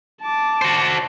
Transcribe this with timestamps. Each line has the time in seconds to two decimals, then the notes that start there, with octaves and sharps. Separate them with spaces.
0.22 A5 D6
0.62 F#4 C5